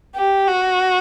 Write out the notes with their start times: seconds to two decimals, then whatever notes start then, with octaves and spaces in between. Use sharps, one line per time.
0.16 G4
0.48 F#4